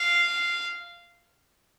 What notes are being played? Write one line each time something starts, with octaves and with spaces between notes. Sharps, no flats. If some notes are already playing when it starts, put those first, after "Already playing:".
Already playing: F5